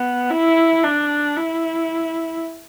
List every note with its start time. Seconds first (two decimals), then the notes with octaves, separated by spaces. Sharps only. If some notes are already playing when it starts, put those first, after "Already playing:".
Already playing: B3
0.31 E4
0.83 D4
1.37 E4